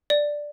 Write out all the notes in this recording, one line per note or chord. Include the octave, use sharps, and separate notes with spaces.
D5